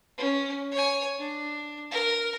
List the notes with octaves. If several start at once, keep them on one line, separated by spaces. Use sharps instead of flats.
C#4
C#5 G#5
D4
A#4